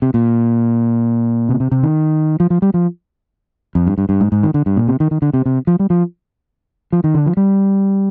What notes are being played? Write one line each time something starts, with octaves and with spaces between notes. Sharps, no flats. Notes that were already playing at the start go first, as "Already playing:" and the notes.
C3
A#2
C3
C3
C3
D#3
F3
F3
G3
F3
F2
G2
G2
G2
G#2
G#2
D#3
D3
G2
A#2
C3
D#3
D#3
D3
C3
C3
F3
G3
F3
F3
D#3
D3
F3
G3